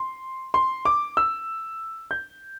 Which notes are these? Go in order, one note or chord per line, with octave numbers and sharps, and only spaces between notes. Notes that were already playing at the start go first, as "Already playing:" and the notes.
Already playing: C6
C6
D6
E6
G6